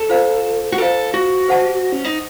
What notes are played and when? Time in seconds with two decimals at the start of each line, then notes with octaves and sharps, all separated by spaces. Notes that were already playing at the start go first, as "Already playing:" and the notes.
Already playing: A4
0.09 F4 C5 F5
0.72 F#4
0.78 F4 A4 C5 F5
1.14 F#4
1.49 C5 F#5 A5
1.92 C#4
2.05 D#4